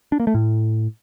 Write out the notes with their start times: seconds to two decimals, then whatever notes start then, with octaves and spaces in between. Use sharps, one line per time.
0.12 D4
0.20 A#3
0.27 A3
0.34 A2